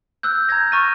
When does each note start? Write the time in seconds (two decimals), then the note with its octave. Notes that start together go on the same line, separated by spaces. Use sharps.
0.23 E6 F#6 G6
0.49 A#5 G6 G#6 A#6
0.72 A#5 C#6 F6 A6 A#6 D#7